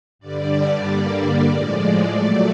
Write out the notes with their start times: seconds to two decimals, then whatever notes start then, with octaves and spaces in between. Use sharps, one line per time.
0.19 G2 D3 G3 D5
0.84 G2 D3 G3 A#3
1.49 A2 F3 G#3
2.13 A#2 F#3 A3 D5